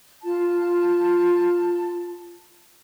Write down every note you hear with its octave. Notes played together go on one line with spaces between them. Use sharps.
F4 A5